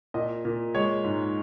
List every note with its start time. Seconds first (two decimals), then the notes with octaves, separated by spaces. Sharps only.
0.14 A#2 D#5
0.45 A#2
0.74 G#3 C#5
1.04 G#2